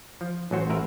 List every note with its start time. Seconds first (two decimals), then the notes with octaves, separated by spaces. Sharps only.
0.21 F3
0.51 A1 F#3 F#4 C5
0.69 A1 A#4 B4 E5